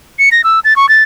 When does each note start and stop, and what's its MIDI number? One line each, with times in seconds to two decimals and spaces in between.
0.19 0.29 97
0.32 0.42 94
0.44 0.60 88
0.64 0.76 93
0.76 0.89 85
0.89 1.03 93